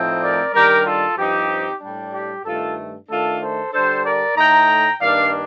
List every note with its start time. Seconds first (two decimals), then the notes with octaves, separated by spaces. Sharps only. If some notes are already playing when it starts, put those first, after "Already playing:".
Already playing: A2 F3 A3 C4 D#4
0.22 A#4 D5
0.54 D#3 G3 D4 G4 A#4
0.86 F4 A4
1.18 G2 F3 C4 D#4 G4
1.81 A2 G3 D4
2.14 G4
2.45 G2 D#3 A3 F4 A4
3.09 D#3 A3 D4 F4 A4
3.41 A4 C5
3.73 D3 G3 D4 A4 C5
4.05 A#4 D5
4.37 A2 A3 D#4 G5 A#5
5.01 G2 D#3 A#3 D4 D5 F5